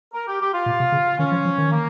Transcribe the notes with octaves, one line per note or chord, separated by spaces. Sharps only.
A#4
G4
G4
F4
A#2
C3
C#3
D#3 C#4
F3
F3
D#3
A#3